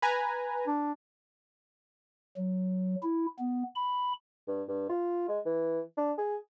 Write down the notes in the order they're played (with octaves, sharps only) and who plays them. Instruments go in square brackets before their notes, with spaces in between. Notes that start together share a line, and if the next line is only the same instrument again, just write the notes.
[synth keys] B4 G#5 A#5
[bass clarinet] D4
[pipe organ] F#3
E4
B3
B5
[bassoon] G2
G2
F4
G#3
E3
D4
G#4